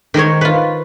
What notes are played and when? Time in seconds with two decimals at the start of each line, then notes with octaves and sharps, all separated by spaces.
0.14 D#3 A#4 C5 C#5
0.41 F4 B4